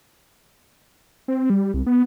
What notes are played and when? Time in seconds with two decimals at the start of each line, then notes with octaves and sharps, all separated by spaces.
1.28 C4
1.50 G3
1.74 C2
1.87 B3